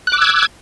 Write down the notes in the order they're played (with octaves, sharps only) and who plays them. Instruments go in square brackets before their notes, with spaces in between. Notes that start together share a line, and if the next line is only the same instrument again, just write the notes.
[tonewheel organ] F#6
D6
E6
G#6